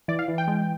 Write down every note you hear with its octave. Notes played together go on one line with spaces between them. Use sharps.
E3 D5
F5
E3
G5
G#3